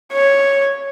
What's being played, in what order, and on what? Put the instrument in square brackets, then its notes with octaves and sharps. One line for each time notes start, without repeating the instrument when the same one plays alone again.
[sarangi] C#5